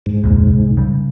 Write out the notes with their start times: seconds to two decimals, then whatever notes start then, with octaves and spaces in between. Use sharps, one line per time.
0.06 G#2
0.24 F1 D2 A#2
0.46 C2
0.77 C#3 G3